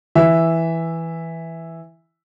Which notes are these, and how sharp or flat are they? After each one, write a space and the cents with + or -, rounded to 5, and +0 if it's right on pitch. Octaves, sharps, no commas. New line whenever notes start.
E3 +0 E5 +0